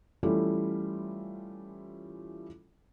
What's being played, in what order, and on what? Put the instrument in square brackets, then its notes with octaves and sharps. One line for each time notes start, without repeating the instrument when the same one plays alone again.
[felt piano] E3 G3 A3 C#4 E4 F4